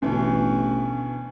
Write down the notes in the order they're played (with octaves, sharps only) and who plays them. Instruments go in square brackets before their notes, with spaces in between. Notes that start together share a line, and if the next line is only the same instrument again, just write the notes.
[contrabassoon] A1 [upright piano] D2 B2 E3